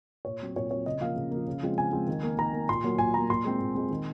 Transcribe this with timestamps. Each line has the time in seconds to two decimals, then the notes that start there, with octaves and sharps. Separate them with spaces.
0.25 A#2 C#5
0.41 F#3 C4
0.56 A#2 C#5
0.71 F#3 C4 C#5
0.86 C#3 D#5
1.01 F3 A#3 F5
1.16 C#3
1.31 F3 A#3
1.48 C#3
1.63 F3 G#3 C4
1.78 C#3 G#5
1.92 F3 G#3 C4
2.07 D#3
2.23 A#3
2.39 D#3 A#5
2.53 A#3
2.69 A#2 C6
2.84 F#3 A#3
2.98 A#2 G#5
3.14 F#3 A#3 A#5
3.30 A#2 C6
3.45 G#3 C4
3.61 A#2
3.75 G#3 C4
3.91 D#3